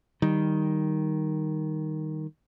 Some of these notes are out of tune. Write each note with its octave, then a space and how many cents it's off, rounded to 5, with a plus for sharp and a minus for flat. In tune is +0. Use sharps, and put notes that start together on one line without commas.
D#3 +0 G3 +0